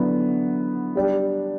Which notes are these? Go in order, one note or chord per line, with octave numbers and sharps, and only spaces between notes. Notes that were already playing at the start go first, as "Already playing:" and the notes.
Already playing: D3 F#3 B3 E4
G3 D4 G4